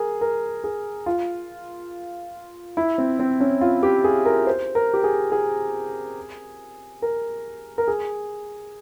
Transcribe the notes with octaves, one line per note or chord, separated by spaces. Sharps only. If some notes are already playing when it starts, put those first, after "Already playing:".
Already playing: G#4 A#4
A#4
G#4
F4
E4
C4
C4
C#4
F4
G4
G#4
A#4
C5
A#4
G4
G#4
G#4
A#4
A#4
G#4